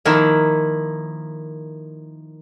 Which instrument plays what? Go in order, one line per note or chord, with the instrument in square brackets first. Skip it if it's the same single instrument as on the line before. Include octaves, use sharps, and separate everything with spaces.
[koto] D#3 F3 A#3 E4